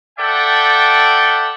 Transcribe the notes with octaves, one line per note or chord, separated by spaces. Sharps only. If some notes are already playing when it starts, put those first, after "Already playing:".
A4 D5 E5 F#5 G5